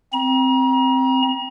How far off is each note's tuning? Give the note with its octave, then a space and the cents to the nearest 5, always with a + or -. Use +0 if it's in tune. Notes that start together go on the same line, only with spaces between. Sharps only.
C4 +0 A#5 +40